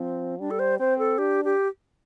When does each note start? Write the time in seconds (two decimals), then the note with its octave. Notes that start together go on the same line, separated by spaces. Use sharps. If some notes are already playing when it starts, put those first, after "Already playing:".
Already playing: F3 C4
0.40 G3 D4
0.51 A4
0.59 C5
0.79 C4 C5
0.99 A4
1.18 D4 G4
1.45 G4